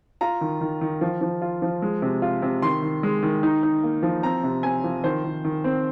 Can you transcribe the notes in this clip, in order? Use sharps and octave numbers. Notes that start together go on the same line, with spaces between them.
F4 A#5
D#3
D#3
D#3
F3
F3
F4
F3
G#3
C3
F4
C3
D#3 C6
D#3
G#3
D#3
D#4
D#4
A#3
F3
C4 A#5
C3
C4 G#5
F3
D#3 C5
D#3
D#3
C4